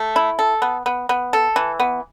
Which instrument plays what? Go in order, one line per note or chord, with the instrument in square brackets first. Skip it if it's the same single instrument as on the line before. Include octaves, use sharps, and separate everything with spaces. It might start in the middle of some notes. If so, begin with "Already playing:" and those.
Already playing: [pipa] A3
E4
A4
B3
B3
B3
A4
E3
B3